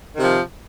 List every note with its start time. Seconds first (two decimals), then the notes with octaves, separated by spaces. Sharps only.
0.13 D#3
0.16 C3
0.19 F3